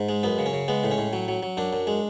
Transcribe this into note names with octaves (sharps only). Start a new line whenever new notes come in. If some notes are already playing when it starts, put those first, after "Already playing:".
Already playing: G#2
G#3
F#2 B3
C#3
C#4
C#3
G#3 B3
A2
C#4
A2
F#3
F#3
F#3
F#2 D4
F#2
G#3